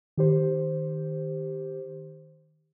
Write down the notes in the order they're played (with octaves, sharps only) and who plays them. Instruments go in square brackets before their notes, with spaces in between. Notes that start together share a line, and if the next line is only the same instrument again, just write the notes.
[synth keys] D#3 G4 C5